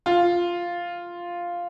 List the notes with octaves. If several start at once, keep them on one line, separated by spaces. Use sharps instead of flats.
F4